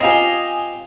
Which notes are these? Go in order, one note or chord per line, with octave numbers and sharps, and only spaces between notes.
C4 F4 G4 D#5 G#5